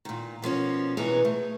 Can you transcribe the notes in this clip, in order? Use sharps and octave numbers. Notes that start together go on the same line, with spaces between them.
A#2 D#3
B2 F3 A#3 C#4
B2 E3 G#4 B4 C#5 A#5
A3